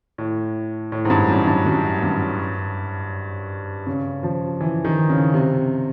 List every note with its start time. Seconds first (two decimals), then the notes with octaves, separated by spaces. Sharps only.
0.18 A2
0.92 A2
1.05 G#2
1.10 G2
1.28 F#2
1.47 G2
1.66 F#2
2.03 G2
3.87 C#3
4.23 F3
4.61 E3
4.84 D#3
5.10 C#3
5.34 C3